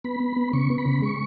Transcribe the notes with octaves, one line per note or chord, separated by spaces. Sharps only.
B3 B5
B3
B3
C#3 C#6
B3
B5
C#3
G#3 C#6